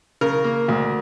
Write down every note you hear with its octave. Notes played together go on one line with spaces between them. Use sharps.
C#3 A#4
A#3
D2